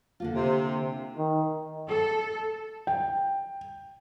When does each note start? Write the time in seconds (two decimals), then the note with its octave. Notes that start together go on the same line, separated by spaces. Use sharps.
0.20 D3 A#3 F4
0.35 C3
1.17 D#3
1.88 A4
2.87 G5